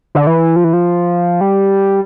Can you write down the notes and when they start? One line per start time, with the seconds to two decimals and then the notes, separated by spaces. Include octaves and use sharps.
0.15 D3
0.27 E3
0.56 F3
0.64 E3
0.73 F3
1.41 G3